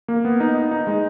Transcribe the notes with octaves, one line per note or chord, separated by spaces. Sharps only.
A#3
B3
D#4
D#4
D#4
G#3